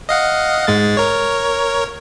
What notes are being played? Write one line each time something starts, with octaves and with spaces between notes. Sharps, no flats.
D#5 F5 F#5
G#2 G#3 A6
A#4 C#5